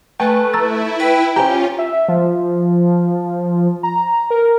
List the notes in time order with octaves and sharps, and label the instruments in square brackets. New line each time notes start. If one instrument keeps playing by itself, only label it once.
[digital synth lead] A3 [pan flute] B4 [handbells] G5 G#5
[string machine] E4 [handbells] A#5 E6 A6
[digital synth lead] B4 [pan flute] G5
[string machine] C#4 F4 [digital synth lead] G4 [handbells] C5 G#5 A#5
[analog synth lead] E5
F3
A#5
A#4